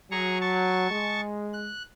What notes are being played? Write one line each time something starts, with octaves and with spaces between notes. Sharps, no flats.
F#3 G#4 A#5 C#6
A5 C#6
G#3
F#6